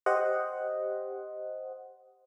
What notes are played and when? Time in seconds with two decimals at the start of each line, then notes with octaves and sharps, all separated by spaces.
0.06 G4 C5 D#5 F#5